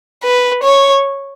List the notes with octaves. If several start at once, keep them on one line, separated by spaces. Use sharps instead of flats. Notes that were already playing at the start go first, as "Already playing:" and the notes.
B4
C#5